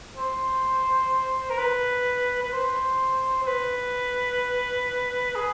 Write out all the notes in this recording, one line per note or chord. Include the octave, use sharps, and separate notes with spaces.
C5
A#4
B4
B4
C5
C5
B4
G#4